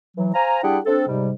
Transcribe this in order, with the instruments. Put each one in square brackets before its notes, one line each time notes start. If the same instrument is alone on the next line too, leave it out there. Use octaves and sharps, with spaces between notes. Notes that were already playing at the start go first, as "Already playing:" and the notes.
[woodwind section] E3 F#3
C5 F5 G#5 A#5
G3 D4 E4 G#4 F#5 G5
C4 D4 A4
G#2 C3 G3